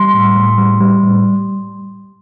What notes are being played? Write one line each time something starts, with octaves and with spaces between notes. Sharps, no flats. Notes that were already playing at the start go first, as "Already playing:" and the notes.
Already playing: G3 C6
A2
A2
G3
G3
A2